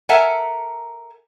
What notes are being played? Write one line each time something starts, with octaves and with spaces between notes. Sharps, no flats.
A4 A#4 E5 F#5 G#5 A#5